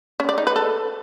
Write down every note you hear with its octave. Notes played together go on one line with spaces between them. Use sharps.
C#4
D5
D#4
B4
A4